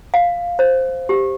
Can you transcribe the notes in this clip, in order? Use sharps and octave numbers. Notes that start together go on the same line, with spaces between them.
F5
C5
G4